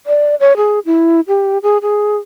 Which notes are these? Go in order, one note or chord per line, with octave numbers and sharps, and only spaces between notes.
D5
C#5
G#4
E4
G4
G#4
G#4